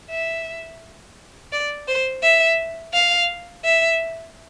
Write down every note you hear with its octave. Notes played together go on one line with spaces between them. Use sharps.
E5
D5
C5
E5
F5
E5